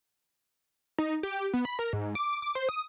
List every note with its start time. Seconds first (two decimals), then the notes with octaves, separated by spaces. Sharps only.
0.98 D#4
1.23 G4
1.54 B3
1.65 B5
1.79 A#4
1.93 G#2
2.15 D6
2.42 D6
2.55 C5
2.69 D#6